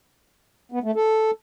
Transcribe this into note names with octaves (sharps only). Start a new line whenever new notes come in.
B3
A3
A4